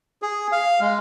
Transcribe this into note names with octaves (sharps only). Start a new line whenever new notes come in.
G#4
F5
G#3